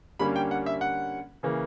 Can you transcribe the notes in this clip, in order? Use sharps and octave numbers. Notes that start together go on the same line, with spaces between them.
D3 G3 A#3 C#4 B5
G5
F#5
E5
F#5
C#3 E3 A#3 C#4